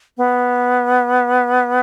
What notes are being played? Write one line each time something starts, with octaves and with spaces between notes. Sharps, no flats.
B3